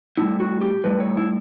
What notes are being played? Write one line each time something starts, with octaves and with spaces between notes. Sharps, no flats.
A2 G3 E4
F#4
G4
A2 G3 B4
C#5
E4